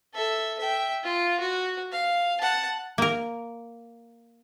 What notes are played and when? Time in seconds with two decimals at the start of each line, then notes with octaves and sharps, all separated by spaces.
0.14 A4 E5
0.59 E5 G5
1.03 F4
1.40 F#4
1.92 F5
2.41 F#5 A5
2.98 A#3 A#4